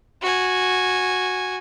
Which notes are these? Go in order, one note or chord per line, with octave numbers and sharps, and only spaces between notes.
F#4 G#5